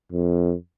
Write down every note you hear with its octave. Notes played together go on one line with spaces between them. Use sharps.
F2